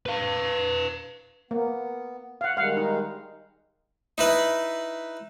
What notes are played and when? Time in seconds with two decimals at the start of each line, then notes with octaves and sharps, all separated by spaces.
0.06 B4 F5
1.51 A#3 B3
2.41 F5 F#5
2.57 D#3 G3 G#3 F5 F#5
2.77 D#4
4.18 D#4 E4 B4